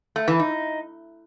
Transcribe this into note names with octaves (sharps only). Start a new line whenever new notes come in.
A3
E3
D#4